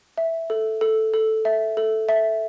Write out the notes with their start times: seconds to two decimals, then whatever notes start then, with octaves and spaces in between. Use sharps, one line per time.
0.18 E5
0.50 A4
0.81 A4
1.14 A4
1.45 E5
1.77 A4
2.09 E5